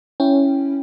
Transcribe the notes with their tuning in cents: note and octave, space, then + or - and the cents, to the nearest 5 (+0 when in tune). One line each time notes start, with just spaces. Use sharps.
C#4 +0 E4 +0 G5 +0